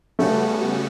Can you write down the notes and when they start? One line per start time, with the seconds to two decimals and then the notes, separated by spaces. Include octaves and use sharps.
0.19 C#3 G3 A3 B3 F#4